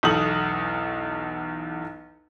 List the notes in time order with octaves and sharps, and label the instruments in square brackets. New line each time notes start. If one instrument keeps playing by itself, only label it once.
[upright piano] B1 E2 A4 D#6 F#7